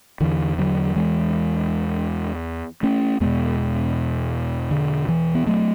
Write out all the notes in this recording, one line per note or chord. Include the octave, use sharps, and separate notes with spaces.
E2 D3 E3
D3 F#3
E3 G#3
A3 C#4
E2 B2 G#3 B3
D3
E3
B3
F#3 A3